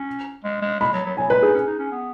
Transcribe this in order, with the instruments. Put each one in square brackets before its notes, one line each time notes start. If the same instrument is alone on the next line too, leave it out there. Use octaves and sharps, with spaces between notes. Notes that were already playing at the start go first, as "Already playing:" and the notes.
Already playing: [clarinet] C#4
G#3
G#3
[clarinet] G#3 [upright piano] B5
[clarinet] F#3
F#3
[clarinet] F#3 [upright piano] G#5
[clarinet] G#3 [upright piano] B4
[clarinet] D#4 [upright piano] G#4
[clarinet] C#4
D#4
C#4
B3